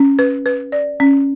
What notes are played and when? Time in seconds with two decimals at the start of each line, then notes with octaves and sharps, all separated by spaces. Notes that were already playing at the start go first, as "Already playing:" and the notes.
Already playing: C#4
0.19 B4
0.46 B4
0.72 D5
1.00 C#4